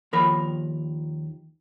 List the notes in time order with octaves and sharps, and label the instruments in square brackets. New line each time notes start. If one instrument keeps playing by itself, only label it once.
[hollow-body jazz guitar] D#2 F3 A#4 B5